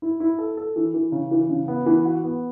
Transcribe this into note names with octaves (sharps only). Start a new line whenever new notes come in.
E4
E4
A4
A4
E3
E3
C#3
E3
C#3
B3
E3
F#4
B3